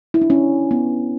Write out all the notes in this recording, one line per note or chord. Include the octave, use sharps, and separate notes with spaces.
E4
D4
C#4
B3